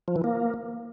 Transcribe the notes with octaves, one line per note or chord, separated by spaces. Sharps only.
F3
E3
A#3